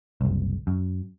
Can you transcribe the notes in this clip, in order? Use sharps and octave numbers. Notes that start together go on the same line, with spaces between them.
F#1 C2
F#2